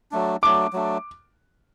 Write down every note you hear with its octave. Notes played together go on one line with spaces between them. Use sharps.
F#3 A3 D4
F#3 A3 D4 D6
F#3 A3 D4